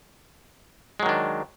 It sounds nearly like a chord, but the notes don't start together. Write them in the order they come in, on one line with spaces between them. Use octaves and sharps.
G#3 F#3 D#3 D4